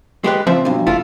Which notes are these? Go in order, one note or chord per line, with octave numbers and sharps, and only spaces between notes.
G#3 G4 B4
C#2 F3 C4 E5
B1 G2
F#1 A3 E4 F4